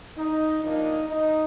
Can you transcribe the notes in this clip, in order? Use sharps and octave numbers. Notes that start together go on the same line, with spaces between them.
D#4
A#2 F3 A#3 D4 D#4
D#4